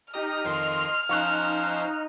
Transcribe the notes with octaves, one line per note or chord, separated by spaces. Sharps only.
D#4 G4 D#5 A#5 D#6 F6
F2 D#3 F3 D#5 C6
F3 C#4 D#4 C5 F5 C#6 F#6